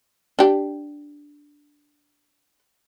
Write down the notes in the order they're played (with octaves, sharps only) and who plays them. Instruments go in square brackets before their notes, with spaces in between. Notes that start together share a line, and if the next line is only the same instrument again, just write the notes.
[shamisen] D4 G4